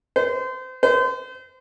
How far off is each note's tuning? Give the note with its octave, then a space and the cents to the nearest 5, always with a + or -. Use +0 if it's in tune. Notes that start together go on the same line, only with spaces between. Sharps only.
C5 -30
C5 -35